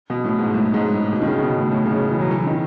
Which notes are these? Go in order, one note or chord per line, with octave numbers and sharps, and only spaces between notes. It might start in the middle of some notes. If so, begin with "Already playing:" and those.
B2
A2
G#2
A2
G#2
A2
B2
D#3
C#3
B2
A2
A2
C#3
B2
E3
F#3
E3
D#3